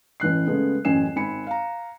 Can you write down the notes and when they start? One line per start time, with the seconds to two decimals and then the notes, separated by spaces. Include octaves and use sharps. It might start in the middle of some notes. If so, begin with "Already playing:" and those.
0.20 A1 E3 F#6 C7
0.46 C#3 G#3 A3 B3
0.85 A1 F#2 G#5 C7 E7
1.16 G#1 C4 G#5 B5 C#7
1.47 F5 A#5